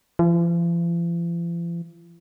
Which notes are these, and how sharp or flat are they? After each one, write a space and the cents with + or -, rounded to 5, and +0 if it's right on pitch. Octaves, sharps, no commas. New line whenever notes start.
F3 -45